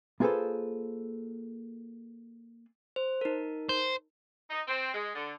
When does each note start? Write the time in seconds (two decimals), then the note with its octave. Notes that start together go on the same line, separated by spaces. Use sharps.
0.20 A#3 F4 G#4 A4 B4 C5
2.96 C5
3.21 D#4 A#4
3.69 C5
4.51 D#4
4.68 C4
4.94 G#3
5.15 D3